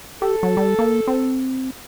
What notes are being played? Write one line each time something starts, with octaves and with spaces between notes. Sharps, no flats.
G4 A4
F#3
G3
A#3
C4